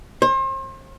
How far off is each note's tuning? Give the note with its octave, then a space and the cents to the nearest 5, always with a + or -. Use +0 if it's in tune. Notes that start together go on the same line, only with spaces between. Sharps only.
C5 +35